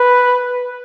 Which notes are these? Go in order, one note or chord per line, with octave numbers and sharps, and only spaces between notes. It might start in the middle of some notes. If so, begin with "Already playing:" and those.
Already playing: B4